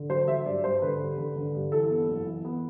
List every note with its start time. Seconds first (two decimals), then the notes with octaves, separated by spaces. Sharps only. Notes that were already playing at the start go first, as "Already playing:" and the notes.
Already playing: D3
0.09 F#3 C5
0.28 F#3 E5
0.46 G2 D5
0.64 G2 C5
0.82 D3 B4
1.00 G2
1.18 D3
1.36 D3
1.54 G2
1.72 E3 A4
1.90 B3
2.08 F#1
2.27 E3
2.45 B3